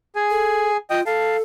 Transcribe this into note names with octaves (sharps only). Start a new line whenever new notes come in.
G#4 G#5
A4
F4 D#5 G5 D#6
A4 F5 A5